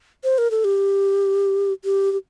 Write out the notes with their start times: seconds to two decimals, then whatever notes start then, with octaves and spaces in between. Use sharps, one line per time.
0.24 C5
0.38 A#4
0.51 A4
0.64 G4
1.85 G4
2.12 G4